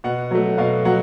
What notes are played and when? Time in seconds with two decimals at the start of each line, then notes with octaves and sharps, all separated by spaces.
0.04 B2 F#5
0.31 F#3 A3
0.58 B2 F5
0.85 F#3 F#5